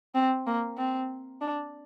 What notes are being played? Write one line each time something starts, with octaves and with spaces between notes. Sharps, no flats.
C4
A#3
C4
D4